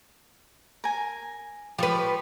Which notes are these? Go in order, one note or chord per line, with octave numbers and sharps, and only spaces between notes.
A#4 G#5
F3 G4 B4 C#6